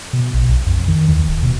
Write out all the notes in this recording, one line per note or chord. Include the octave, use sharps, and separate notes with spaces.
B2
A#1
B1
F2
D#3
D#2
D1
B2